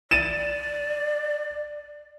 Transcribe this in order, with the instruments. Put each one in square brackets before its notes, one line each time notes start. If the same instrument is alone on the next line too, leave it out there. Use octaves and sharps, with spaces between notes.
[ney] D5 [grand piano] A6 D#7 E7